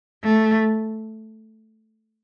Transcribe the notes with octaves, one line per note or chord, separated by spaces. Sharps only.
A3